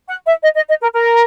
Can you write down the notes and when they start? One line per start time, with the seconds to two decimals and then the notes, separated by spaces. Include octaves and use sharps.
0.09 F#5
0.26 E5
0.43 D#5
0.56 D#5
0.68 D#5
0.82 A#4
0.94 A#4